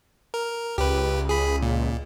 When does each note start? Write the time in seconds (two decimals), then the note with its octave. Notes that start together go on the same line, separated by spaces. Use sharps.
0.34 A#4
0.78 C#2 G4 B4
1.29 G#4 B5
1.62 A#2